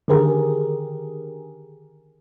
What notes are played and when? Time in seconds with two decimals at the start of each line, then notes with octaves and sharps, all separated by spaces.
0.08 D3 D#3 G4 G#4 A#4